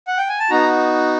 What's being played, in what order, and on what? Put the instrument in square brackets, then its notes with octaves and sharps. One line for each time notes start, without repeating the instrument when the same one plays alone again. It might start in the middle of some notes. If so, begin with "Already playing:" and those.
[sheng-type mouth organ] F#5
G5
G#5
A5
B3 D#4 F#4 A#5